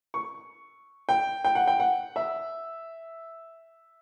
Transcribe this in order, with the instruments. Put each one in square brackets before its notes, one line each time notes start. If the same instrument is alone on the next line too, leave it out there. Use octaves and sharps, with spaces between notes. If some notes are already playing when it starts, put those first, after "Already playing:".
[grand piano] C#6
G5
G5
F#5
G5
F#5
E5